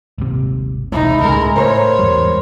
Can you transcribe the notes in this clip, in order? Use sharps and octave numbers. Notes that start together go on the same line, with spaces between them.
D#1 G#1 C3
E1 C2 G#2 D#4 E4
C#2 A2 G#3 A#4
A2 A#4 C5 C#5
E2 G#2 G3